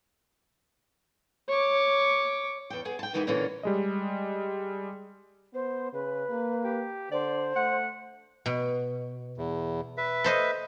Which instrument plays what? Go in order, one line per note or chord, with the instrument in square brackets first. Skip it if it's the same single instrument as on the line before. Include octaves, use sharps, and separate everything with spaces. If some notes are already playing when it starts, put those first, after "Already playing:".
[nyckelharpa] C#5 D6
[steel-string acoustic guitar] E2 G5
B3 G#4
G5 A5
B2 D#3 E3 G#3 E4 G4
A#2 D3 E3 A#3 C#4 D4
[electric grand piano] G3 G#3 D#5
[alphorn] B3 [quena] C5
[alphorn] C#3 [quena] B4
[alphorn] A#3
[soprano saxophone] G4
[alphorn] D3 [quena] C5 [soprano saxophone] D5
[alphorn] A3 [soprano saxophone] F#5
[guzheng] B2
[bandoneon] E2
B4 E5
[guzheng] A4 C5 D#5